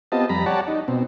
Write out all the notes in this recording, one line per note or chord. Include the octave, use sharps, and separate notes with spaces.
B3 C4 F4 G4 D#5 A5
F2 G3 A#5 B5
G4 C#5 D5 F#5 A5
D#4
B2 C4